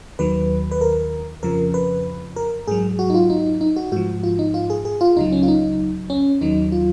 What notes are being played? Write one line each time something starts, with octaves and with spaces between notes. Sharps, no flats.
D#2 D#3 F#3 B4
B4
A#4
F2 C#3 F3 A#4
B4
A#4
G#2 F#3 G#4
F#4
D#4
F4
D#4
D#4
F#4
G#2 F3 F#4
F4
D#4
F4
G#4
G#4
F4
C#2 C#3 F#3 D#4
C#4
F4
D#4
C#4
D#2 D#3 F#3 D#4
F4